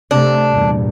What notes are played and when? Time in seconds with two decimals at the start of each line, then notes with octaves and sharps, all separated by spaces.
0.11 C3 A3 D4
0.50 E2 G2 A#2